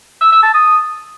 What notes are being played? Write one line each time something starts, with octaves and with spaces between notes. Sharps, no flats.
E6
E6
A5
D#6